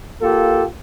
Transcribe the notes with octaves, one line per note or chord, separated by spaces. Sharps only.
A#3 F4 G4 A4